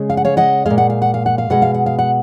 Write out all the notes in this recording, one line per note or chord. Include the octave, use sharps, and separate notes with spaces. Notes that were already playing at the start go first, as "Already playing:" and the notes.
Already playing: C#3 G#3
F5
F#5
C#5 F5
D#5 F#5
A#2 G#3 F5
F#5
F5
F#5
F5
F#5
F5
B2 G#3 F#5
F5
F#5
F5
F#5